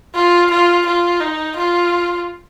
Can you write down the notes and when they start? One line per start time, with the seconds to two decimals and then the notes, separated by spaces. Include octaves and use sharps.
0.14 F4
0.50 F4
0.86 F4
1.21 D#4
1.56 F4